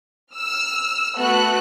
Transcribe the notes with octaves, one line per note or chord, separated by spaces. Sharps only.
E6 F6
A3 B3 F#4 F#6